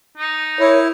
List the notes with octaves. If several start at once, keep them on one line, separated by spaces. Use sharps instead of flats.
D#4
E4 A#4 C#5